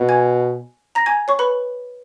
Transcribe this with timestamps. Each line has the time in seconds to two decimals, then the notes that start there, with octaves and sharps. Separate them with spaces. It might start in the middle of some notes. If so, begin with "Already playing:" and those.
Already playing: B2
0.09 G#5 G#6
0.95 A#5 A#6
1.06 G#5 G#6
1.28 C#5 C#6
1.39 B4 B5